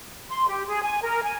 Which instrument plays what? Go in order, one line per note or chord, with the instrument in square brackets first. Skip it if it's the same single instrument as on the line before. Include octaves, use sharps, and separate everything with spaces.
[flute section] C6
G4
G#4
G#5
A#4
G#5